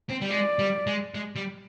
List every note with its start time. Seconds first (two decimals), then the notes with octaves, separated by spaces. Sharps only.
0.10 C4
0.21 G3
0.30 G#3 D5
0.59 G3
0.87 G#3
1.15 G#3
1.36 G3